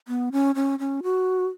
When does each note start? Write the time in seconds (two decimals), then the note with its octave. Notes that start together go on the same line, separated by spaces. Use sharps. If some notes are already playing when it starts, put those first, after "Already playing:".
0.08 B3
0.32 C#4
0.55 C#4
0.79 C#4
1.03 F#4